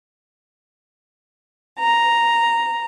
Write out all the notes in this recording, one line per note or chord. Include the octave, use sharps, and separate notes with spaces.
A#5